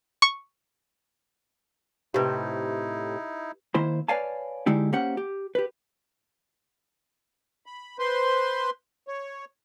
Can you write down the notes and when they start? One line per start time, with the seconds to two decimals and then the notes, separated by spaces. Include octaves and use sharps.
0.22 C#6
2.14 A2 C3 D#4 E4 G4 B4
3.74 D#3 A#3 E4 C5 C6
4.08 B4 C#5 D5 F5 G#5 A5
4.66 D3 G#3 D#4 E4 G4
4.93 A#3 C#4 G4 C5 F#5
5.17 G4
5.55 G4 B4
7.66 B5
7.99 B4 C5 C6
9.08 C#5